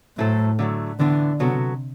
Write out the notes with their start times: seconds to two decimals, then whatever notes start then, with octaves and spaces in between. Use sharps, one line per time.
0.17 A2 F#3 A3 E4 A4 C5
0.59 D3 F#3 A3
0.99 A2 D3 E3 B3 D4
1.40 C3 F#3 B3 F#4 A4